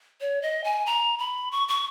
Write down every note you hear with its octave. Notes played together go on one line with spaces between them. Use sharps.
C#5
D#5
G#5
A#5
B5
C#6
C#6